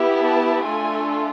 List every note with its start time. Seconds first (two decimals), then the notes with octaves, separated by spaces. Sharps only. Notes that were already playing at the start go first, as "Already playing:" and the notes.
Already playing: B3 E4 G4
0.18 A5
0.63 A3 D4 F4 A4 G#5